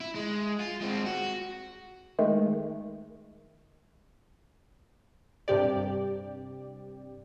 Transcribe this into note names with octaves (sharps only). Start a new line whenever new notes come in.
E4
G#3
F4
G#3 C4
F#4
D#3 G#3 A3
G2 C3 G4 D5